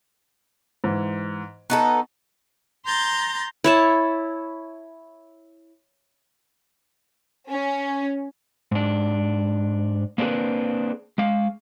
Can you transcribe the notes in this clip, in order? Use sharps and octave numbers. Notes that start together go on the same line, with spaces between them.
G#2 E3
B3 D#4 A4 F#5 A5 C#6
A#5 C6 G6 A6
E4 C#5 A5
C#4
G#2 D4
A#3 C4 D4 G#4 B4
G#3 F5